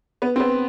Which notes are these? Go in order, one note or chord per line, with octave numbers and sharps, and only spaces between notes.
B3
C4
B3